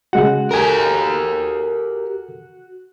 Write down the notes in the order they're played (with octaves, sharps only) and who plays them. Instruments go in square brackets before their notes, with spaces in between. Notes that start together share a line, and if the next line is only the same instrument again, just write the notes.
[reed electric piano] C#3 G#3 F#5 [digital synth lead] F#4
[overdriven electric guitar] G4 A#4 [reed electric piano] A4 G#5